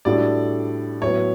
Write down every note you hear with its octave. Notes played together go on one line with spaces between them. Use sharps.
A2 G3 D4 F#4 A4 D5
A2 F#3 B3 C#5